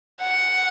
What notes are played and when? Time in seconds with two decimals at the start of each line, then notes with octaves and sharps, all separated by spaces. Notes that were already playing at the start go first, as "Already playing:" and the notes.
0.22 F#5